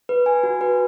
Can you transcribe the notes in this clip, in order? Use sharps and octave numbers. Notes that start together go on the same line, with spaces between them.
B4
G#5
F#4
B4